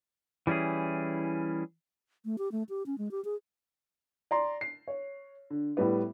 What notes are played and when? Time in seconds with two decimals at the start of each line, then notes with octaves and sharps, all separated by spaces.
0.47 E3 G3 C#4 E4 G#4
2.25 A3
2.38 G4
2.52 A3
2.69 G4
2.86 C#4
2.98 G#3
3.11 G4
3.25 G#4
4.31 D5 A#5 C6
4.61 C7
4.88 C#5
5.50 D3
5.77 A2 G3 B3